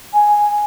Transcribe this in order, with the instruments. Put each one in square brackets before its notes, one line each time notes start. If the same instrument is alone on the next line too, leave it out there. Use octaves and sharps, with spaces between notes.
[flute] G#5